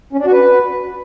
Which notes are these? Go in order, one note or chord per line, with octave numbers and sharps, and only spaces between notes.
C#4
D4
F#4
B4